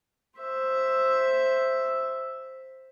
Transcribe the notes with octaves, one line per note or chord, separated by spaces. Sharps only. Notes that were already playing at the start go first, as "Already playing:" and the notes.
C5 E5